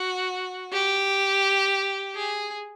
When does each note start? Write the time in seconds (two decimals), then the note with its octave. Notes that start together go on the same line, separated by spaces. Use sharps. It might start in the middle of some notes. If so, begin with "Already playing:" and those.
Already playing: F#4
0.72 G4
2.16 G#4